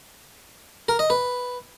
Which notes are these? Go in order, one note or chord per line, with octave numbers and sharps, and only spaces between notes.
A#4
D#5
B4